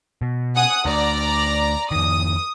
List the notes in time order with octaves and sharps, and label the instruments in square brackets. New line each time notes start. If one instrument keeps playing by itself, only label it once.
[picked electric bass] B2
[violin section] F#5 G#5 D#6
[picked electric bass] D2 [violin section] D5 A#5
[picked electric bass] F2 D#3 [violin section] D#6